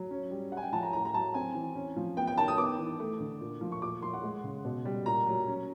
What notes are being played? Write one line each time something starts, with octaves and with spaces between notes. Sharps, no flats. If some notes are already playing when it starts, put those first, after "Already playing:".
Already playing: F#3
C#4
G3
C#4 F#5
G#5
G5
F3 A5
A#5
A2 A#5
A#5
F#3 A5
C4 G#5
E3
C#4
F3
B3 G5
G5
D#3 A5
D#6
B3 D6
E3
A3
D3
A#2
F3
C#6
A#2 D6
F3 C6
F#5
G#3
C#3
B2
G3
A#2 A#5
F#3
C#4